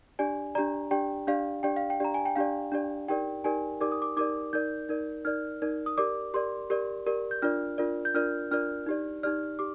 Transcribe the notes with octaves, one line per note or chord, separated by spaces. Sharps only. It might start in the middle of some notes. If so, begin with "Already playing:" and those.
D4 G4 D5 G#5
D4 G4 D5 A#5
D4 G4 D5 G5
D4 G4 D5 F5
D4 G4 D5 G5
F5
G5
D4 G4 D5 A#5
G#5
G5
D4 G4 D5 F5
D4 G4 D5
D#4 G4 A#4 D5 G5
D#4 G4 A#4 D5 G#5
D#4 G4 A#4 D5 D6
D#6
D6
D#4 G4 A#4 D5 D6
D#4 A#4 D5 G6
D#4 A#4 D5
D#4 A#4 D5 F6
D#4 A#4 D5
D#6
G4 A#4 D5 D6
G4 A#4 D5 C6
G4 A#4 D5
G4 A#4 D5
G6
D4 F4 A#4 D5 F6
D4 F4 A#4 D5
G6
D4 F4 A#4 D5 F6
D4 F4 A#4 D5 F6
D#4 G4 D5
D#4 G4 D5 F6
G4 D6